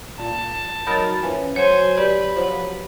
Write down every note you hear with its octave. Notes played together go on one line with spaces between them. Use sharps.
A#2 A5
F#3 D#4 A#4 B5 A6
E3 F3 C#4
F#3 C5 C#5 G#5
G4 B4 D5
F3 F#3